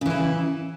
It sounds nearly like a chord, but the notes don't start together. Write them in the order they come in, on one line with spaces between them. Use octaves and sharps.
C#3 E3 E4